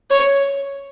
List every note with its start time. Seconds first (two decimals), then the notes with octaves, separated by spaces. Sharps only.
0.10 C#5